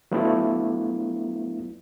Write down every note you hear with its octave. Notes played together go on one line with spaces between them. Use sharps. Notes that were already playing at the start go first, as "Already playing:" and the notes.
F#3 A3 B3 D4 E4 F4